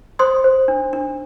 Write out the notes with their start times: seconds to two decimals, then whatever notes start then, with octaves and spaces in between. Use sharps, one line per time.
0.19 C5 C6 D#6
0.44 C5
0.68 D4
0.93 D4